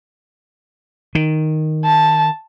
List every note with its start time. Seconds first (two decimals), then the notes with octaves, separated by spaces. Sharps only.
1.15 D#3
1.85 A5